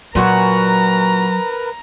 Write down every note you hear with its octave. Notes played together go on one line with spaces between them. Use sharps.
A#2 F#3 F#4 A#4 B4 A#5